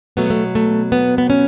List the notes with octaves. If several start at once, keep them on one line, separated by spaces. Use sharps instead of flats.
B2 F#3 A3 B3
A3
A3
B3
B3
C#4